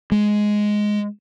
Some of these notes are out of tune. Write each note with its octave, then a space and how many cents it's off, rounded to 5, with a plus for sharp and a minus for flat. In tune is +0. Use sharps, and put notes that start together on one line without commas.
G#3 +5